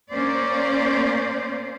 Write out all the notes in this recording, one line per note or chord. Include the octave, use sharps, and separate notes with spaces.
A#3 C#4 C5 D5